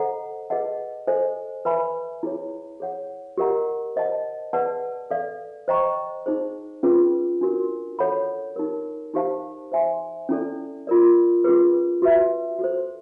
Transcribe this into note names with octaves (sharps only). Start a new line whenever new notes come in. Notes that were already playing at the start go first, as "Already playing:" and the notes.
Already playing: A4 C5 D#5 F#5 A#5
G#4 B4 D#5 F#5 A5
A4 C5 D#5 G#5
B4 E5 G#5 B5
E4 G#4 C#5
G#4 C#5 F#5
G4 A#4 D#5 F#5 A#5
C5 D#5 F#5 A5
G#4 B4 D5 F#5 A5
A4 D5 F5
C5 D#5 G5 A#5 C#6
D#4 G#4 C5
C#4 F4 G#4 B4
D4 F#4 A#4
A4 C#5 F#5 B5
D#4 G4 A#4
D#4 G4 C5 F5 A5
C5 E5 G#5 C6
C#4 E4 A4 D5
F4 A#4 D5
C#4 F4 G#4 B4
F#4 B4 E5
F#4 A4 C5